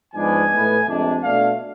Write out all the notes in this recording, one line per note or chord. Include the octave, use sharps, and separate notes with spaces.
G#2 F3 G#3 B3 D4 G#5
A2 E3 B3
F2 C3 G#3 D4
B2 A3 D4 F5